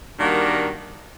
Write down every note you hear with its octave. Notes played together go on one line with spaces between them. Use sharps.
D#3 G3 A#3 D4 F#4